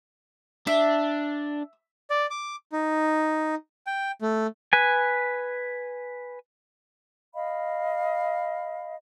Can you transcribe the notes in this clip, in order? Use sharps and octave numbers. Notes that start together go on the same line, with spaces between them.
D4 E5
D5
D6
D#4
G5
A3
B4 G#5
D#5 F5 B5